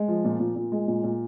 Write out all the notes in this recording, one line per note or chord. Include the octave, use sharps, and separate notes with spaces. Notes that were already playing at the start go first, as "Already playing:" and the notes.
Already playing: G#3
F3
A#2
A#2
A#2
G#3
A#2
A#2